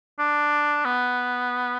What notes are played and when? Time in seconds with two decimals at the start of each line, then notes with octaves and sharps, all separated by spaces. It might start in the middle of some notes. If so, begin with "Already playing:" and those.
0.19 D4
0.85 B3